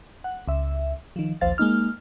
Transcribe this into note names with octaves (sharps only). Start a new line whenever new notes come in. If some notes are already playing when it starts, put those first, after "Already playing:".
F#5
C#2 E5
D#3 F3
A#1 D#2 F3 C5 F5 A6
G#3 A#3 D#4 F6